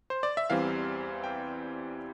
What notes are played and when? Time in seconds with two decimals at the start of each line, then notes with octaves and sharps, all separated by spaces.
0.10 C5
0.23 D5
0.37 E5
0.50 E2 E3 G3 C4 F5
1.24 G5